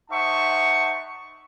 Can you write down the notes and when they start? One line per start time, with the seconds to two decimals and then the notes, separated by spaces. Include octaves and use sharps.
0.11 D#4 C5 E5 F#5 A5 C#6